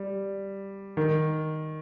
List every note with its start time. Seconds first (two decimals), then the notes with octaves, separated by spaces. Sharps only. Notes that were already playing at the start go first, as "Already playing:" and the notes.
Already playing: G3
0.97 D#3